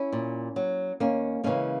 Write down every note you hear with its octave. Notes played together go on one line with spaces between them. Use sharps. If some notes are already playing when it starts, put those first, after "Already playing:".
Already playing: C#4 E4
A#2
F#3
D#2 A#3 C#4
C#3 E3 G#3 A#3 C#4